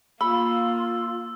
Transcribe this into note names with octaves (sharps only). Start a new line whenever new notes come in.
A#3 F4 B5 E6